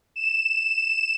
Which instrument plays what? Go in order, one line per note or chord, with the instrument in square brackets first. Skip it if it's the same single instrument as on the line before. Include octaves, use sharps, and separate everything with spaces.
[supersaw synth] E7